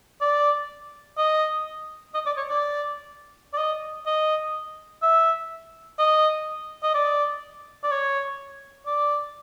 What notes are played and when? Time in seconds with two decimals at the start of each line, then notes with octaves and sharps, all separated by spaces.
0.21 D5
1.17 D#5
2.14 D#5
2.26 D5
2.37 C#5
2.49 D5
3.53 D5
3.58 D#5
4.06 D#5
5.02 E5
5.98 D#5
6.83 D#5
6.94 D5
7.83 D5
7.91 C#5
8.86 D5